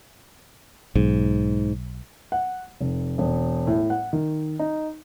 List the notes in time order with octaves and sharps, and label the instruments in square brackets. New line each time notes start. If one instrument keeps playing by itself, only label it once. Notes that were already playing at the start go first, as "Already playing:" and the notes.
[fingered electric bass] B1 [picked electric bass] G#2
[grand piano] F#5
F1
E1
A2
F#5
D#3
D#4